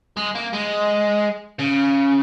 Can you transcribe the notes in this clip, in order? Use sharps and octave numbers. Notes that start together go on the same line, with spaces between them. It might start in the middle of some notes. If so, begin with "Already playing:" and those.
G#3
A#3
G#3
C#3